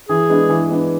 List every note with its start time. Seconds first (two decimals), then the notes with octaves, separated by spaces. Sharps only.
0.09 E3 G#4
0.30 G#3 B3 D4
0.49 E3
0.71 G#3 B3 D4